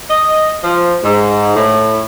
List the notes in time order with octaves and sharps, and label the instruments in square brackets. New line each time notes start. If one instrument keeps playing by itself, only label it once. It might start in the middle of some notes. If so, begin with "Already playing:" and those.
[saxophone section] D#5
F3
G#2
A2